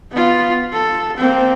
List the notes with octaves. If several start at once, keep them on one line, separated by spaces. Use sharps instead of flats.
B3 F4
A4
A#3 C4